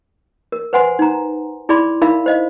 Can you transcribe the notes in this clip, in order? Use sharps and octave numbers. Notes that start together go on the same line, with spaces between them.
A#4
B4 C5 F#5 G#5 C6
D#4 A#5
E4 G#4 D5 B5 C6
D#4 E4 A#4 E5 F5 B5
C5 D#5 F5